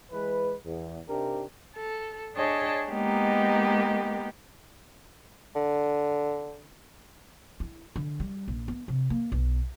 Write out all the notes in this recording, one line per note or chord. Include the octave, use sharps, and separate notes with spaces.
E3 G#3 B4
E2
C3 D4 D#4 G4 A#4
A4
D4 G#4 C#5 D#5 G5 A5
G#3 A#3 B3 D#4 G4
D3
E4
D3
G3
A#1
B3
C3
A#3
B1